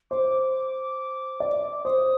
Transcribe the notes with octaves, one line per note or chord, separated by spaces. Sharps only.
C5 D6
D5
C5 D#6